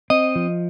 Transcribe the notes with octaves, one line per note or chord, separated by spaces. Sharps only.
C4 D#5
F3